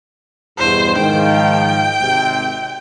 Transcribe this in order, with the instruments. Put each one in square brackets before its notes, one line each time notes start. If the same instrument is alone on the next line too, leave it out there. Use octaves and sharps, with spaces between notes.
[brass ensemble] E2 G2 B2 [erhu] C5
[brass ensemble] G#2 D#3 F3 [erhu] G5
[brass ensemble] G#1 C3